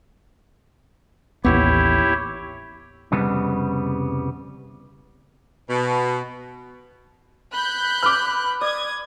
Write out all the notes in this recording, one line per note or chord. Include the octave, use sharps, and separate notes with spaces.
A1 D#2 B3 E4 G4 C#5
C2 F2 C#3 G3 B3
B2
B5 F#6 G6
B4 D6 F6
D5 D#6 G#6